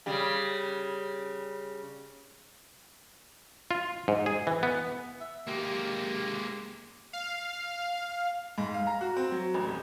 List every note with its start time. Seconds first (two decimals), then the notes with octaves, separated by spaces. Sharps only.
0.06 C#3 G3
3.71 F4
4.08 G#2
4.26 G#4
4.47 E3
4.63 B3
5.20 E5
5.48 G#3 A#3 G4
7.13 F5
8.58 G#2
8.74 F5
8.87 A#5
9.01 F#4
9.16 C4
9.32 F#3
9.54 A1
9.67 D#1